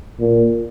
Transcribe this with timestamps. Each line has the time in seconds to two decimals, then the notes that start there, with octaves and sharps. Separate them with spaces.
0.20 A#2